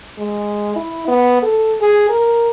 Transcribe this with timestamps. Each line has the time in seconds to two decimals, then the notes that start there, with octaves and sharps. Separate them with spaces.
0.19 G#3
0.76 E4
1.08 B3
1.42 A4
1.81 G#4
2.10 A#4